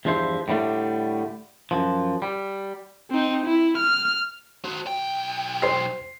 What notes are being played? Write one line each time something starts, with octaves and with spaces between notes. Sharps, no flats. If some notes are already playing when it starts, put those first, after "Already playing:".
E2 G2 F3 E4 C5 E5
A2 D3 G3 A3
F#2 F3
G3
C4 D#4
E4
F6
F#4 C5
B1 G5
C5 C6 C7